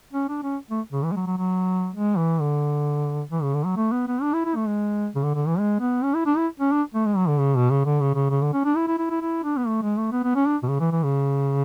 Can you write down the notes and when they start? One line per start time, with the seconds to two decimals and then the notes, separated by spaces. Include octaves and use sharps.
0.13 C#4
0.29 D4
0.43 C#4
0.71 A3
0.92 C#3
1.04 E3
1.12 G#3
1.16 F#3
1.27 F#3
1.38 F#3
1.95 G#3
2.17 E3
2.41 D3
3.31 E3
3.43 C#3
3.54 D3
3.65 F#3
3.76 A3
3.92 B3
4.07 B3
4.22 D4
4.33 E4
4.45 E4
4.56 A3
4.67 G#3
5.15 C#3
5.24 D3
5.35 D3
5.47 E3
5.59 G#3
5.80 B3
6.04 C#4
6.15 E4
6.26 D4
6.37 E4
6.60 C#4
6.72 D4
6.94 A3
7.06 G#3
7.17 F#3
7.28 D3
7.39 C#3
7.55 B2
7.71 C#3
7.85 D3
8.00 C#3
8.15 C#3
8.30 C#3
8.42 D3
8.53 C#4
8.65 D4
8.76 E4
8.88 E4
8.99 E4
9.10 E4
9.21 E4
9.43 D4
9.57 B3
9.67 A3
9.82 G#3
9.97 A3
10.12 B3
10.24 B3
10.35 C#4
10.46 D4
10.63 B2
10.69 C#3
10.80 E3
10.92 E3
11.03 C#3